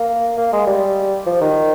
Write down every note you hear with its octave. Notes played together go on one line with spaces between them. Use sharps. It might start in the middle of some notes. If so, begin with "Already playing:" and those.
Already playing: A#3
A#3
G#3
G3
F3
D#3